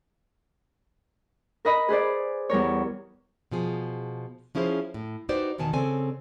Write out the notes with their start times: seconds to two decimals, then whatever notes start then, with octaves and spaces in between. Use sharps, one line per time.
1.65 A#4 B4 D#5 B5
1.89 G#4 B4 C5 D5
2.49 E2 G3 A#4 C#5
3.51 B2 F3 G#4
4.55 F3 C#4 E4 G#4 C5
4.94 A2
5.29 D#4 F#4 G4 B4 C5 D5
5.58 E2 B2 D#3 G#5 A5
5.73 C#3 C4 A4 D5 G#5